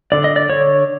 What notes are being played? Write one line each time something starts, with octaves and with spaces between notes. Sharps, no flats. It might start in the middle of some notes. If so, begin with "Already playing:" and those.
D3 D5
D#5
D5
D3 C#5